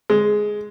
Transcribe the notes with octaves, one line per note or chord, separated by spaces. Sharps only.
G#3